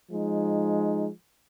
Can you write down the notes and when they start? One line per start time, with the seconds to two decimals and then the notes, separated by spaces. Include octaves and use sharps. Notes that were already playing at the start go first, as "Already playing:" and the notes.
0.10 F3 G#3 D#4